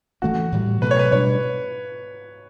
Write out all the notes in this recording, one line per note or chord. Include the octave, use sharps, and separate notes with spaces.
E3 A3 C#4 F#4
A2 E3 G3
B2 F#3 A3 B4
C#5
B4
B2 G3 D4 C#5